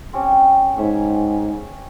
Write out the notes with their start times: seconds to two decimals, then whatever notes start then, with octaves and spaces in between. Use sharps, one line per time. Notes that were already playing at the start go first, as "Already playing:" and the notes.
0.13 C4 C#4 G4
0.78 G#2 C#5 E5